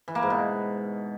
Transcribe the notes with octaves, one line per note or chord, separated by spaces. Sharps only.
E3
A#3
G#2
B2